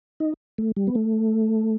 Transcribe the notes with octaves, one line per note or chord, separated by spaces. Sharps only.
D#4
A3
G3
B3
A3